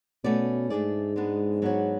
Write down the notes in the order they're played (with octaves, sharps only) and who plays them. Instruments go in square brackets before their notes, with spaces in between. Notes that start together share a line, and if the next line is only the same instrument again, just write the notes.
[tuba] B2 [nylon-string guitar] A3 C#4 F#4 B4 D5
[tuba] G#2 [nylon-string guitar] A3 D4 G#4 D5
[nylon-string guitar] G#3 B3 D4
F#3 B3 D4 F#4 C#5